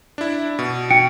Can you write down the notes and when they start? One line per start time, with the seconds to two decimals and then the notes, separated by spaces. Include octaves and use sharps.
0.18 D4 E4
0.59 B2
0.91 G5 C#7 D7